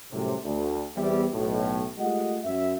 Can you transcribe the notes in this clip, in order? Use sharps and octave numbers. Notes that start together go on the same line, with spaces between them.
C2 F#2 A2 C3
D2
E2 G3 B3 C4 G4 E5
B1 A2
G#3 A3 F4 G4 D#5 F#5
F#2 E5